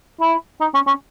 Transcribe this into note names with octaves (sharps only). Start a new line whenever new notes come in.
E4
D#4
C#4
C#4